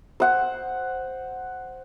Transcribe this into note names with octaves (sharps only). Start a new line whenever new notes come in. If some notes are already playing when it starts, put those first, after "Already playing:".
C5 F#5